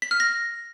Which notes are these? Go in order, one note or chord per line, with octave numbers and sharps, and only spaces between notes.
B6
F6
A#6